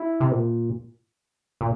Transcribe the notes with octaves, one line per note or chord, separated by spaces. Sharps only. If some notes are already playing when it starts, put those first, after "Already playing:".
Already playing: E4
C3
A#2
A#2